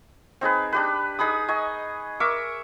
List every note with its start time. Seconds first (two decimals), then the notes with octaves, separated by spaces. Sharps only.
0.41 C4 D#4 G#4 B4
0.73 D4 G4 B4
1.19 D#4 G#4 B5 D#6
1.48 D#5 G#5 C#6
2.20 A#4 E5 C#6 D6